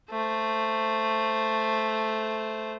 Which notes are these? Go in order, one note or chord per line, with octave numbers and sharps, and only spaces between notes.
A3 C5